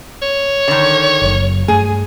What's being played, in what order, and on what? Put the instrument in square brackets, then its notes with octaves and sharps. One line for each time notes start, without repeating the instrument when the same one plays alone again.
[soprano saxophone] C#5
[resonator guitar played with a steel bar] D3 D#3
[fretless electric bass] F#1 F#3
[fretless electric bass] G2 A3 [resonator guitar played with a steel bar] G#4